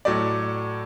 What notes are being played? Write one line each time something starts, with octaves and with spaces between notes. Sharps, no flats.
A2 F#3 A3 D5